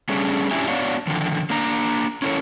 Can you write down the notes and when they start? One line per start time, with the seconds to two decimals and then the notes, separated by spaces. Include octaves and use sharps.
0.09 G3 A3 C#4 D4 G#4
0.51 C#4 D4 E4 G4 E5 G#5
0.68 B3 D4 F#4 C#5 D5 F5
1.07 D3 D#3 F3
1.50 A#3 D4 A#5
2.22 C#4 E4 A4 A#4 C#5